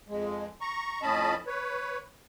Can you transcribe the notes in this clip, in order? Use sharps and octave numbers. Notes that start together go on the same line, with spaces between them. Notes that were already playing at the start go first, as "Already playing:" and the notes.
F2 G#3
A#5 C#6
F2 A2 C#4 D#5 A5 B5
B4 C#5